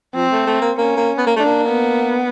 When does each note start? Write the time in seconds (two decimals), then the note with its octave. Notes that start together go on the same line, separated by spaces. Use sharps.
0.15 F3 C4
0.32 A3
0.47 A3
0.61 A#3
0.77 A#3 C#4
0.97 A#3
1.18 B3
1.27 A#3
1.36 A3 D4
1.46 A#3
1.69 B3